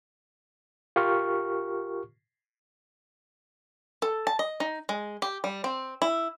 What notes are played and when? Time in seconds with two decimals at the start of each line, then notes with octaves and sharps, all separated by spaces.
0.96 F4 G4 A#4 C#6 F6
4.02 A4
4.27 A5
4.39 D#5
4.60 D#4
4.89 G#3
5.22 G4
5.44 G3
5.64 C4
6.02 E4